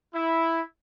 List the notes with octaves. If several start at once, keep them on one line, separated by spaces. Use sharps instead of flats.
E4